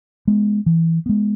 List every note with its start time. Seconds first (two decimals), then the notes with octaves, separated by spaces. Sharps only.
0.28 G#3 B3
0.66 E3
1.06 G#3 B3